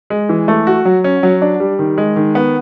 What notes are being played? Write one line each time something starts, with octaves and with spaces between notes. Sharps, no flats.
G#3
E3
A3
F#4
F#3
C#4
F#3
D4
G3
D#3
G#3
D#3
B3